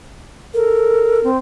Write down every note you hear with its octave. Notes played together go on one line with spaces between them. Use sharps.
A4 A#4
C4